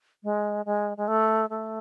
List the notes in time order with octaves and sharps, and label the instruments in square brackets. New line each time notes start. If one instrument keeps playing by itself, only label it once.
[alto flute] G#3
G#3
G#3
A3
A3